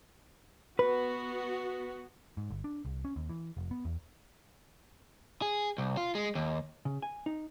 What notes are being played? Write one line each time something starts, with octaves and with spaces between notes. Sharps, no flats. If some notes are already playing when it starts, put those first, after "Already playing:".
B3 F#4 B4
G#2
G1
D4
C2
C#4
D#2
E3
F1
B3
E2
G#4
C2
F4
G#3
D#2
C#3
G#5
D#4